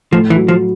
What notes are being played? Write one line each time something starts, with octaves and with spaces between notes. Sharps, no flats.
A2 F3
E3
F#3
F3